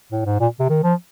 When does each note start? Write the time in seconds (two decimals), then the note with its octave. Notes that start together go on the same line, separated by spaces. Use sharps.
0.12 A2
0.26 G#2
0.40 A#2
0.60 C3
0.69 D#3
0.83 F3